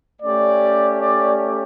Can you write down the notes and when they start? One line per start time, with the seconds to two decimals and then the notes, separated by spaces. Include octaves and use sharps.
0.22 A3 C#4 G4 D5
0.99 D5